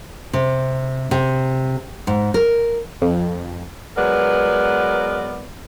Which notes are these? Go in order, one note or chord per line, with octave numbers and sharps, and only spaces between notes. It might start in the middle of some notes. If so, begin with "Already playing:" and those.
C3
C3
G#2
A#4
F2
F#3 G#3 B3 A#4 B4 D5